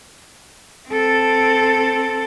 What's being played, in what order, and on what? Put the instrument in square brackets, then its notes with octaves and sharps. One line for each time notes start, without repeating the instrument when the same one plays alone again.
[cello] C4 A4